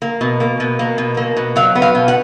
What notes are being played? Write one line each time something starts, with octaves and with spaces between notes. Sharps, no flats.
A#3
B2
A#3
B2
A#3
B2
A#3
B2
F#3 F5
B3
F5
B2
F#5